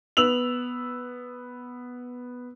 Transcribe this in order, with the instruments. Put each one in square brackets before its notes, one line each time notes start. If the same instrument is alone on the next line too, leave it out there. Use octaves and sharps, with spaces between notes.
[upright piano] B3 E6 F7 F#7